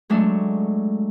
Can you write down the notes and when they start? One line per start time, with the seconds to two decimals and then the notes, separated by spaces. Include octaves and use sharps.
0.10 F#3 G#3 A3 D4